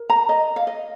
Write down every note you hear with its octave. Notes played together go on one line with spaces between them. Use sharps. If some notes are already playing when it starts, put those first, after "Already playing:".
Already playing: A#4
A#5
D#5
F5
D#5